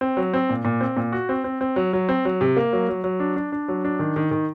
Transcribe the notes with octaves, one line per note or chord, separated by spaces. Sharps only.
C4
F#3
C4
A#2
A#2
C4
A#2
F#4
C4
C4
C4
F#3
F#3
C4
F#3
C3
A#3
F#3
F#3
F#3
D4
D4
D4
F#3
D4
D#3
D#3
D#3